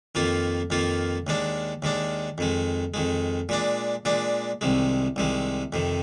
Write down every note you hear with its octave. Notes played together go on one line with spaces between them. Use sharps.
F2 D#3 A#3 F4
F2 D#3 A#3 F4
D#2 D#3 G#3 D4
D#2 D#3 G#3 D4
F2 D#3 G#3
F2 D#3 G#3
A#2 G#3 D4
A#2 G#3 D4
C2 C3 D#3 G#3
C2 C3 D#3 G#3
F2 C3 D#3